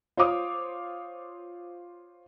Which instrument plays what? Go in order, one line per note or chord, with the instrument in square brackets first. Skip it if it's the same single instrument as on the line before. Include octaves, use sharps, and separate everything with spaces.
[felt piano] F4 C5 C#5 F5 D6 D#6